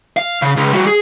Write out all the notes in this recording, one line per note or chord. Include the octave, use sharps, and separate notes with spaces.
F5
C#3
C#2
G3 F#4
G#4